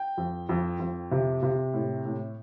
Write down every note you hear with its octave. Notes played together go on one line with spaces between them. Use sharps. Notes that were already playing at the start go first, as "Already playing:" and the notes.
Already playing: G5
F2
F2
F2
C3
C3
A2
A2